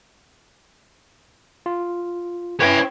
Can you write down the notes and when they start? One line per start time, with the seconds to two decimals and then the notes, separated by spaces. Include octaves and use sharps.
1.66 F4
2.61 C#4 E4 B4 C#5 G5